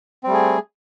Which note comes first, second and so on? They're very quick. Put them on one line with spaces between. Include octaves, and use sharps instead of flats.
C4 G3 A3 G#4